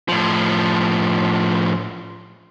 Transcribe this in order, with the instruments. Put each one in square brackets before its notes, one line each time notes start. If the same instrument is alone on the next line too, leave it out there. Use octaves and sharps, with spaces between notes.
[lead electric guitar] A2 F3